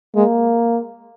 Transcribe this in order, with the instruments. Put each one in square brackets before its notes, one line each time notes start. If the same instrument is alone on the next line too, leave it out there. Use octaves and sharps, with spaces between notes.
[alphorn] G#3 [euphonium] A#3